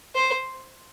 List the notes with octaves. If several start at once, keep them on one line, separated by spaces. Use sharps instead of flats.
C5